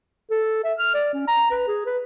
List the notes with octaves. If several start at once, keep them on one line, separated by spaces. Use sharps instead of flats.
A4
E5
F6
D5
C#4
A#5
B4
G#4
B4